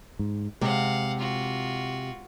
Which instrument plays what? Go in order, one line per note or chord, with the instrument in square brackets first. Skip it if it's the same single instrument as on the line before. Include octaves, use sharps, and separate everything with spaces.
[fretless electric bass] G#2
[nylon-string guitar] C3 [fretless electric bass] G#3 [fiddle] F5 F#5
[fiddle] F4 F#4